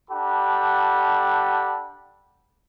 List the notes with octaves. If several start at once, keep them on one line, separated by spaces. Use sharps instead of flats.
D4 G4 A4 F#5 B5